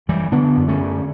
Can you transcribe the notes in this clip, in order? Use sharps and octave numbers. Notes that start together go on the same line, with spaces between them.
F#2 E3 G3
D3 B3 D4
F#2
A3 C#4
D3